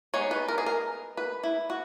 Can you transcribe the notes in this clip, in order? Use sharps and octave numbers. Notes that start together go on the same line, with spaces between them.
G#3 B3 D#4 C#5
B4
A#4
G#4
A#4
B4
E4
F#4